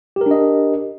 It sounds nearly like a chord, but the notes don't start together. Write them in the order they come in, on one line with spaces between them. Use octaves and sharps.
G4 A#4 D4 D#5